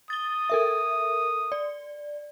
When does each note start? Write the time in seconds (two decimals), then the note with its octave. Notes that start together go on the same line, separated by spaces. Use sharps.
0.10 D#6 A6 G7
0.50 A4 A#4 E5
1.52 D5